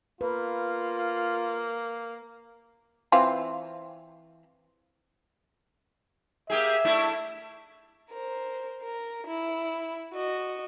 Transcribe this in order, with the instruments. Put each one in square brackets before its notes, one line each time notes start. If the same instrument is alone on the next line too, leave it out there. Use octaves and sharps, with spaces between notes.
[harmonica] A#3 [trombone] F4 [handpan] B4
[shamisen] E3 C4 F4
[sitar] A#3 G4 G#4 [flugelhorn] E5
[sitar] A3 D4 E4
[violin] A#4 C5
A#4
E4
F#4 D#5